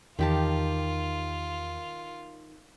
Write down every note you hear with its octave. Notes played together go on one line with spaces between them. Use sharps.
E2 D#3 F4 G4 A5